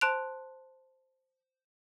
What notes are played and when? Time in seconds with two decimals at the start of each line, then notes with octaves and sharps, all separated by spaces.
0.01 C5 A5 C6 F#6 D7 F7